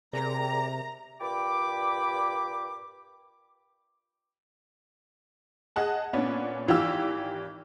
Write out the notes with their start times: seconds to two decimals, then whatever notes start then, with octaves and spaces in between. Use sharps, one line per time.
0.13 C3 G#4 A#4 D5 A#5
1.21 G2 A#2 G5 B5 D6
5.76 G#4 D#5 F#5 A5
6.13 A#2 B3 C#4 D4
6.67 G#1 E3 F4 G4 E6